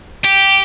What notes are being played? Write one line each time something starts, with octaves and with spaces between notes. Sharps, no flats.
G4